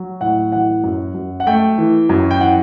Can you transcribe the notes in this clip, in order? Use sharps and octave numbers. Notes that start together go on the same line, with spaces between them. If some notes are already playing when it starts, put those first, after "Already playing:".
Already playing: F#3
A2 F#5
E3 F#5
F#2
F#2
F#5
A3 G5
E3
F#2
G5
E3 F#5